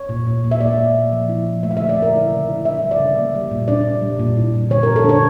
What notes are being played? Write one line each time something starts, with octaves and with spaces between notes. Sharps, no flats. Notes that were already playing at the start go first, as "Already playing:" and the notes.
Already playing: C#5
A#2
A#2
A#2
E5
A#3 D5
A#3
A#3
F3
E4
F3
A3 E5
F5
D3 E5
D5
A3
A#4
E4
C#3
E4
D4 E5
G3
D5
C#3
A#3
G3
A#2
D4 D5
G3
G3
A#2
E4
A#2
D3 C#5
D3 A#4
A4
D4 C#5